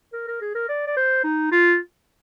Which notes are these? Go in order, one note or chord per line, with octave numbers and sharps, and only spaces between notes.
A#4
A#4
G#4
A#4
D5
D5
C5
D#4
F4